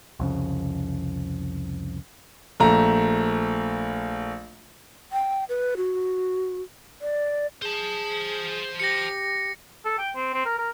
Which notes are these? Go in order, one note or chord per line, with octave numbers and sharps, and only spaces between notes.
C2 F2 C#3
A#1 A3 A#5
G5
B4
F#4
D5
G#4 C5 A5
G4 A#6 C#7
A4
G5
C4
C4
A#4
A#4